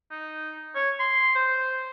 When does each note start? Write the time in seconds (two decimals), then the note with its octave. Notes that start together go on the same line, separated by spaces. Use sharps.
0.11 D#4
0.75 C#5
1.00 C6
1.35 C5